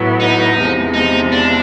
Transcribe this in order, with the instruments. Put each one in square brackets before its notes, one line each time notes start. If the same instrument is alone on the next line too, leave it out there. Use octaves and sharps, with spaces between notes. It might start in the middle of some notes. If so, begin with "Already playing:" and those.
Already playing: [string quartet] A2 F#3 B3 E4
[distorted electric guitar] D#4
[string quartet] E2 C3 F3 G#3
[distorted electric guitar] D#4
D4